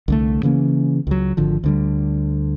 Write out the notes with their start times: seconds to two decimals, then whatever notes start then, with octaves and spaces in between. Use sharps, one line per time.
0.08 C2 D3 A3
0.43 C#3 E3 A#3 C#4
1.07 C#2 F#3
1.37 G#1 D3 F3
1.64 D2 D3 G3